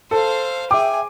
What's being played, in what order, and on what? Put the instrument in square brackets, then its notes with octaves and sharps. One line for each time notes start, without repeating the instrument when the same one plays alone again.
[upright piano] A4 [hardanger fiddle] C5 F5
[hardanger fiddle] G#4 G#5 [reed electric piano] E5 G5 [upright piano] D6